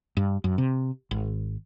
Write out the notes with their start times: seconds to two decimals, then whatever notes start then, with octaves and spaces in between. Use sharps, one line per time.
0.17 G2
0.44 F#2
0.58 C3
1.11 G#1